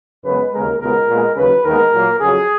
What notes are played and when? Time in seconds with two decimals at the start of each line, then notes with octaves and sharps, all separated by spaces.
0.24 F#2 C#3 G#3 B3 B4
0.52 D#2 C#3 G#3 B3 A#4
0.80 C#2 B2 G#3 B3 A#4
1.08 A#2 G#3 B3
1.36 D#2 C#3 F#3 B4
1.64 D#2 D#3 G#3 B3 A#4
1.93 A#2 F#3 A#3
2.20 F2 C#3 F#3 G#4